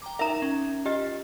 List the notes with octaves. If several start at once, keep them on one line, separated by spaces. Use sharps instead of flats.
G5 A#5 D6
D#4 A#4 E5 A#5
C#4
F4 G4 D#5